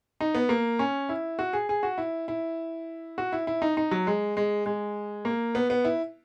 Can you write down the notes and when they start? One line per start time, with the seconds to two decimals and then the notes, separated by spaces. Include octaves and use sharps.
0.21 D#4
0.35 B3
0.49 A#3
0.79 C#4
1.09 E4
1.39 F#4
1.53 G#4
1.69 G#4
1.83 F#4
1.98 E4
2.28 E4
3.18 F#4
3.32 E4
3.47 E4
3.62 D#4
3.77 D#4
3.91 F#3
4.07 G#3
4.37 G#3
4.66 G#3
5.25 A#3
5.55 B3
5.70 B3
5.85 E4